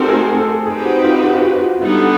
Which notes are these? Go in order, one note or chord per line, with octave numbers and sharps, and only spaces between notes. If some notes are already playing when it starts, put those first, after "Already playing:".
Already playing: A3 C4 D#4 F#4 G4 A4 A#4
G#4
G#4
A4
C4 D#4 G4 G#4 B4
F#4
F4
F#4
F4
F#4
F4
D3 G3 B3 D#4 E4